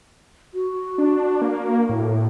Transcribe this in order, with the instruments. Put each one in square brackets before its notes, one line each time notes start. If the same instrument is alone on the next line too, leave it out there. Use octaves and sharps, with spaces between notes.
[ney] F#4
[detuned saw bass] D4
A#3
A2